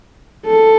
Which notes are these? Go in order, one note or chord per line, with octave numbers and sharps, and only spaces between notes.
A4